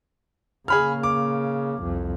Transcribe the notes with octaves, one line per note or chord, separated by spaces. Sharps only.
C#3 A#3 G#4 B5 F6
D6
C2 F2